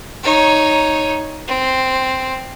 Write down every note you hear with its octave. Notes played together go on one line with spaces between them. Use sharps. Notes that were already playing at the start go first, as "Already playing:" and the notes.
D#4 C#5
C4